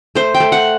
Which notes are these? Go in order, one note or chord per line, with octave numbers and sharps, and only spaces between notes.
A3 C5
G5
A3
F#5